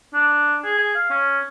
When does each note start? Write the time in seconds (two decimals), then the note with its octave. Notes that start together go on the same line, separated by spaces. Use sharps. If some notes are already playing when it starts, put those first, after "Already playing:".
0.14 D4
0.64 G#4
0.79 G#4
0.95 F5
1.10 C#4